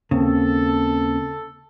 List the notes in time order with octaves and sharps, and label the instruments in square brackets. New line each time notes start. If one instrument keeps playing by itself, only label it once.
[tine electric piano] D#2 A#3 C4 [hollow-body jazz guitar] C#3 [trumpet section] A4